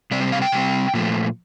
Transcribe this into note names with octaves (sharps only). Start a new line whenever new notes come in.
C3 G3 C4 D5
C5
F5
G5
C3 G3 C4
A#2 F3 A3